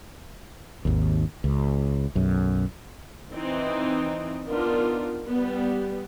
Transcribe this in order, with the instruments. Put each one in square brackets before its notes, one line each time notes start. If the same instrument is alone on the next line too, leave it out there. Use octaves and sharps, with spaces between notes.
[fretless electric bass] G#1 D#2
C#2
B1 F#2
[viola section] E3 C4 D#4
B3 D4 D#4 F4 A#4
G3 B3